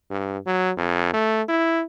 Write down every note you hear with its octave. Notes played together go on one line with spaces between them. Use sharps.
G2
F#3
F2
A3
E4